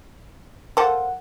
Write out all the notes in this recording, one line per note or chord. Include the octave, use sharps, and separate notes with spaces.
F3 A4 A#4 F#5